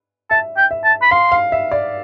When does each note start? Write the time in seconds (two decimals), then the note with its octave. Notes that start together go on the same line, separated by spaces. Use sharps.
0.30 E5 A5
0.57 G5
0.71 E5
0.84 A5
1.02 B5
1.11 F5 C6
1.32 F5
1.52 E5
1.71 D5